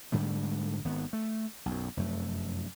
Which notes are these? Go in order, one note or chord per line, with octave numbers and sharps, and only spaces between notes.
G#2 D3 G3 A3
G#1 D#3 B3
A3
B1 F#2
F1 F#2 A3